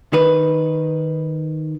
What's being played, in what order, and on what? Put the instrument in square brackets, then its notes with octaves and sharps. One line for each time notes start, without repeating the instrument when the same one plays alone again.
[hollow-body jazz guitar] D#3 B4